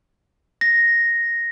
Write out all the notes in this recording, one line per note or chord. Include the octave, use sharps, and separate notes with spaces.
A#6